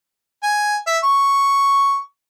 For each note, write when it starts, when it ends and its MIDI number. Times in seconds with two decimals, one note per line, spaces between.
0.43 0.76 80
0.87 0.98 76
1.04 2.00 85